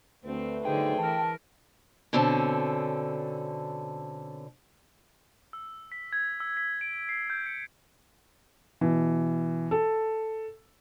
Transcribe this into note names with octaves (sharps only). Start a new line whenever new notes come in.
D2 A3 C4 B4
G1 D3 F#3 D#4 G#4 C5 G5
E3 A#4 A5
B2 D3 C4 C#4 A4
E6
B6
G#6
E6
B6
D7
C7
G6
C#7
B2 E3
A4